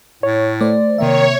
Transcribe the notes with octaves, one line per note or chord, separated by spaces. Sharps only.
A2 C#5
A3 C5 D5
C3 D#3 A#3 C#5 E5